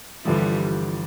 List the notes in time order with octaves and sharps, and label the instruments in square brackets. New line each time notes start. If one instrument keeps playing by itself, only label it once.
[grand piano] G1 G2 D3 F3 [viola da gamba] E3 G3